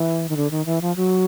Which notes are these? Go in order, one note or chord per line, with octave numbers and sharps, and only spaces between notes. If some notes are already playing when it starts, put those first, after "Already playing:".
Already playing: E3
D#3
D3
D#3
E3
F3
F#3